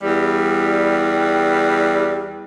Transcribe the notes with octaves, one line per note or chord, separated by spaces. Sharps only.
E2 G3